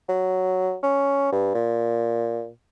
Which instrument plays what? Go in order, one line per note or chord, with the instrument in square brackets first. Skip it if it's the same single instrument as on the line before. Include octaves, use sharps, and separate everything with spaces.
[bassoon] F#3
C#4
G2
A#2